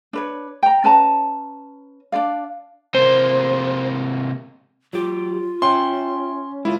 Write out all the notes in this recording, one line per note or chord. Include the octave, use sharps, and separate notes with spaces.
D4 B4 C#5
G5 A#5
C#4 B4 A5 A#5
D4 F4 D5 F5
C3 A#3 C5
F#3 F4 G4
C#4 E5 G5 C6
G#3 A#3 E4 F4